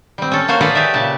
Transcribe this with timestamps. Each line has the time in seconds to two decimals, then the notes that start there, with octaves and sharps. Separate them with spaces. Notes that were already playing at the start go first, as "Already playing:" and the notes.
0.18 G3 C4
0.32 C#4 A4
0.48 A#3 C#4 F#4 C5 F5
0.61 G#4 A4 B4 D5 F5 F#5
0.75 G4 G#4 D5 E5
0.94 A#2 C#3 A5